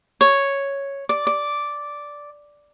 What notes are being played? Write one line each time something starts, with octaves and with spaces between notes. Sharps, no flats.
C#5
D5
D5